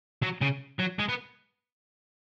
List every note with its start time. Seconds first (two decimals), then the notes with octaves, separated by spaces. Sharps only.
0.23 F#3
0.42 C#3
0.80 F#3
0.99 G#3
1.09 B3